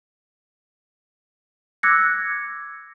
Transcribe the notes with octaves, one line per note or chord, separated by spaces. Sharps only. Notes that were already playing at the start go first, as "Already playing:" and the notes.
D6 E6 F#6 G#6 A#6 C#7